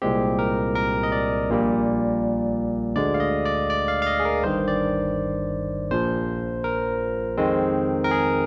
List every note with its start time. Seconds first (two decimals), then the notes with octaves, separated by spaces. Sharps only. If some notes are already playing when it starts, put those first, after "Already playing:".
0.02 C2 A#2 G#3 C4 G4
0.39 A#4
0.75 A#4
1.03 D#5
1.12 D5
1.49 A#1 A#2 G3 A#3
2.96 D2 D3 G#3 D5
3.14 F5
3.20 D#5
3.45 D5
3.70 D5
3.88 F5
4.02 F5
4.07 D#5
4.20 G#4
4.25 A#4
4.43 G1 G2 D#3 C5
4.68 D5
5.91 A#1 A#2 F3 C5
6.64 A#4
7.37 F2 D#3 G#3 C4
8.04 A#4
8.11 G#4